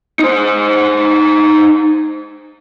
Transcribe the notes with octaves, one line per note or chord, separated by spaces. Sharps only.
D#4 C5